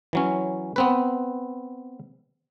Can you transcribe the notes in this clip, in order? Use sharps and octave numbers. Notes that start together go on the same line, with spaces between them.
E3 F#3 C#4
B3 C4 B4